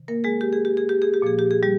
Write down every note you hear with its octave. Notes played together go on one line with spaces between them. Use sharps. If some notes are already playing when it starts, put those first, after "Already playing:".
Already playing: C3 D#3
A#3 A#4
G#3 G#4
G4
G#4
G4
G#4
G4
G#4
G4
A#2 F3 A#3 G#4
G4
G#4
G3 G4